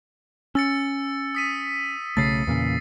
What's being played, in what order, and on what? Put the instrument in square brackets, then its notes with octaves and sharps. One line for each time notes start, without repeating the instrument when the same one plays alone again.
[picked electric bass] C#4 [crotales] E6 A6 C#7
[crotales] D#6 B6 D#7
[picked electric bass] B1 C#3 A3 [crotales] A6 C7
[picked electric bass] E2 A#2 C#3